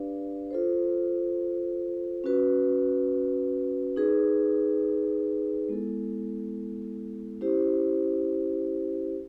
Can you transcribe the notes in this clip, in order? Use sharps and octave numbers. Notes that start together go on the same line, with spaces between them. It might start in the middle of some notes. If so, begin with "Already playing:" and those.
Already playing: D4 G4 B4 D5 F5
F4 A4 C5
C#4 F#4 B4
D#4 G#4 B4
G#3 B3 E4 A4
C#4 E4 G4 C5